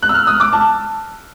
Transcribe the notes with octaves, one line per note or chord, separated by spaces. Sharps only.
F#6
E6
F6
D#6
D6
A5